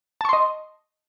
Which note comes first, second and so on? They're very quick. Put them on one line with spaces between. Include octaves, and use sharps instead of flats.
A5 C#6 C6 D#5